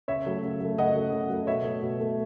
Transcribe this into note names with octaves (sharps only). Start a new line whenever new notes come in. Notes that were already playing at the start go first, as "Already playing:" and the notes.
C#3 C#5 E5
F#3 A3
C#3
F#3 A3
C#3 D#5 F#5
F#3 A3
C#3
F#3 A3
B2 C#5 E5
A3
B2
A3